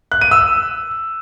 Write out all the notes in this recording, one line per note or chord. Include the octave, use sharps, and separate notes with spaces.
F#6
D#7
E6